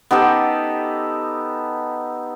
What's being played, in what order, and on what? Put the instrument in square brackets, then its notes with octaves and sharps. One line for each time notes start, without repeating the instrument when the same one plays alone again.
[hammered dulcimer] B3 D#4 G4 A4